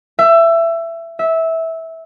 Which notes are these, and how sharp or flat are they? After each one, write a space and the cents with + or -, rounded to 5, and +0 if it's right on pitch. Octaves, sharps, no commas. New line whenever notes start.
E5 +20
E5 -15